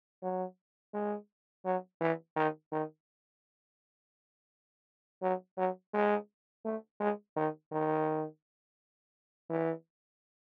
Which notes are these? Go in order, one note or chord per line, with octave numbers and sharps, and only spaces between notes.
F#3
G#3
F#3
E3
D#3
D#3
F#3
F#3
G#3
A3
G#3
D#3
D#3
E3